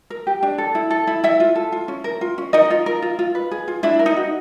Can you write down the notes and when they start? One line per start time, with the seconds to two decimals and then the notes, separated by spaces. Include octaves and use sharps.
0.10 A#4
0.27 G4
0.43 D4
0.58 A4
0.75 E4
0.90 A4
1.07 E4
1.24 E4 A4 E5
1.40 F4
1.55 A4
1.72 F4
1.88 C#4
2.04 A#4
2.21 F4
2.38 C#4
2.53 D#4 A#4 D#5
2.70 F4
2.86 A#4
3.02 F4
3.19 F4
3.35 B4
3.51 G#4
3.68 F4
3.83 D4 E4 E5
3.99 A#4
4.06 D#4 D#5
4.16 F#4